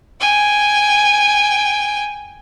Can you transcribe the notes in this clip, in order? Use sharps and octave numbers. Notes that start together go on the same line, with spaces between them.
G5 G#5